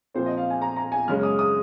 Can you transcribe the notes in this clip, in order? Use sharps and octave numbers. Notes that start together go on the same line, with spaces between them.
A#2 F3 C4 C5
D#5
F5
G#5
A#5
A#5
G#5
F#2 C#3 G#3 C#4 F6
D#6
D#6